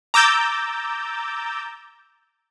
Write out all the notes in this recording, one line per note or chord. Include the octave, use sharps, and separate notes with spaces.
A#5 D6 E6 G6 A6